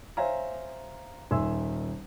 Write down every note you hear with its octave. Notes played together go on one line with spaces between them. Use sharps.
C5 C#5 E5 F5 G#5 A#5
D#1 D#3 E5 G#5 C6 E6